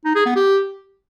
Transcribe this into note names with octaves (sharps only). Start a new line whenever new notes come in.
D#4
G#4
B3
G4